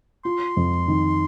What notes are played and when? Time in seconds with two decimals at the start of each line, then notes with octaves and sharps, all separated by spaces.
0.25 F4 C6
0.57 F2
0.88 D#3